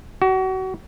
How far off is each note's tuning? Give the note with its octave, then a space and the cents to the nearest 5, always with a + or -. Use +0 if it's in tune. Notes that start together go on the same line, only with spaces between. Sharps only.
F#4 +30